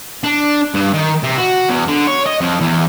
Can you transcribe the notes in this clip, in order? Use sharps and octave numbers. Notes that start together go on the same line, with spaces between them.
D4
G2
D#3
C3
F#4
E2
D3
C#5
D#5
F2
E2